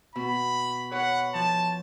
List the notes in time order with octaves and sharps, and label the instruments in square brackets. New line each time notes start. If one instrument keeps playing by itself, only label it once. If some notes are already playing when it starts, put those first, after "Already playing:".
[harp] B2 [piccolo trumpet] B5
[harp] B4 C#5 [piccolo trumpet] F#5
[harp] F3 [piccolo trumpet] A5